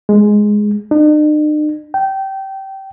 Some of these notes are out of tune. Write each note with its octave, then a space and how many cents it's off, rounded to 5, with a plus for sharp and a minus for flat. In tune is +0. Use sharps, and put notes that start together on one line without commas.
G#3 +5
D#4 -45
G5 -20